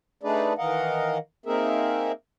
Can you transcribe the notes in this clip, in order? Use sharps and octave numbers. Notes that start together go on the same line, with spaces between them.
A3 D4 D#4 G#4 B4 D5
D#3 E3 A#4 D#5 F5 F#5
A#3 C4 D#4 G#4 A#4 E5